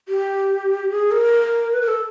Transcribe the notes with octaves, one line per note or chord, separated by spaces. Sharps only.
G4
G#4
A#4
B4
A#4
A4